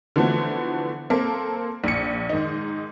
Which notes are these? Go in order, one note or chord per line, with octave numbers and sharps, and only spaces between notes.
D3 E3 F3 A3 B3 F#4
A#3 C4 A4 A#4
A#1 C#7
G#2 D#3 D#4